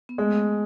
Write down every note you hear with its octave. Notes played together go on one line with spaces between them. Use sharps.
B3
G#3 A3